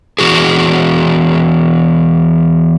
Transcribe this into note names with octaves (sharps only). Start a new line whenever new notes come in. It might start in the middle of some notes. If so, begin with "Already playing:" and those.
E2 C#3 F#4 G#4